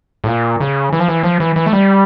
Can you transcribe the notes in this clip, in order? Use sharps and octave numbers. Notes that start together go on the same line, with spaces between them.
A2
A#2
C#3
E3
F3
E3
F3
E3
E3
A3
G3